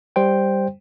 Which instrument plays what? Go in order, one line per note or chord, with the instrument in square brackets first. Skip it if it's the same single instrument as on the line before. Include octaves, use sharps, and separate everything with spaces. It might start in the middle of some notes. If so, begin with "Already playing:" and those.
[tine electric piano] G3 C5 G5